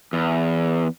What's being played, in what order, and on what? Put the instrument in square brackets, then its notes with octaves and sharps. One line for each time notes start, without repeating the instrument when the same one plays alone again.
[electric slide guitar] E2